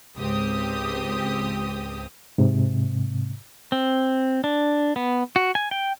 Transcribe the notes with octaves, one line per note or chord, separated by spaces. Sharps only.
C#2 G#2 C4 G4 D#6
G#2 C3
C4
D4
B3
F#4
G#5
G5